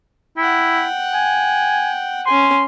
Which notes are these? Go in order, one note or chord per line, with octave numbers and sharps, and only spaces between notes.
E4 F#5 G5
G#5
C#4 G#5 C6